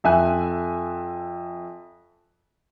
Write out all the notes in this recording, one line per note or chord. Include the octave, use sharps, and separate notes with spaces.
F2 E5 G#5 F#6